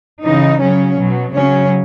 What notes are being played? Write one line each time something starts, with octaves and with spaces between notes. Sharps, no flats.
C#3 E3 D#4
C#3 F#3 C#4
B2 F#3
C#3 F#3 C#4